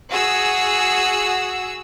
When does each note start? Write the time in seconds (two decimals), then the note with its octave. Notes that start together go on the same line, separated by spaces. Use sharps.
0.11 F#4 G#4 E6